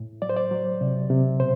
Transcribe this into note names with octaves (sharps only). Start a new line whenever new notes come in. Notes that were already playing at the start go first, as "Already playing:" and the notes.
Already playing: A2
F#3 D5
C5
D5
F#3
C3
C3
B2 C5